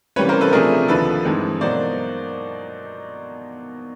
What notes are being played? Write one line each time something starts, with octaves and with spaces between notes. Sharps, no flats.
C3 E3 G3 A#3 C#4 B4 C#5
A#4 C5
A4 B4
C3 F3 A3 D4 G#4 A#4
D#2 D3 F3 A4 B4
G2 E3 G#3 C4 D#4
B2 F#3 A#3 D#4 C5 D5